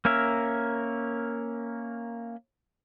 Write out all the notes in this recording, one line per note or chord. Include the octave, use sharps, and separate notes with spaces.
A#3 C#4 A#4 E5